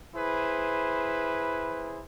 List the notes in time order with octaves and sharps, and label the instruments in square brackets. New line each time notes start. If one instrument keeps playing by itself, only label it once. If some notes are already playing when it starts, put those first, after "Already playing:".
[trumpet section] E4 G#4 B4 C5